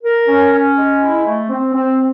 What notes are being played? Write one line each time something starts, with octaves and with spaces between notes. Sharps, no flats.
A#4
C#4
C#4
G#3
E4
A3
C4
C4